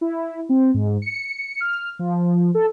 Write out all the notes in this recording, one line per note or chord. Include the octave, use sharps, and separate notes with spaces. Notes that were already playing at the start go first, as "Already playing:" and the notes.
E4
C4
G#2
C#7
F6
F3
A4